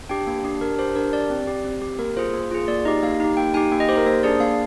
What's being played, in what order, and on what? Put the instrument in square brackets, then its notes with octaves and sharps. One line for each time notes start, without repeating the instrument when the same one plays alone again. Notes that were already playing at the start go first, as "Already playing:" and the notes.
[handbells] D4 G4 G5
A#3
D4 G4
D4 A#4
G4 C5
D4 A#4
G4 D5
C4
G4
C4
G4
A#3 A#4
F4 G#4 C5
A#3
F4 G#4
A#3 D5
D#4 G4 D#5
A#3 F5
D#4 G4
A#3 G5
D#4 G4 G#5
A#3 G5
D#5
G4 C5
D#4
A#4
A#3 C5
D4 G#4 D5
A#3 F5